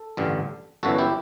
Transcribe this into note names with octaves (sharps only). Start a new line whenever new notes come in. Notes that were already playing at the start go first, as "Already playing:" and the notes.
Already playing: A4
A1 G2 D3
G1 F#2 E3 F#4 A4
E4 G4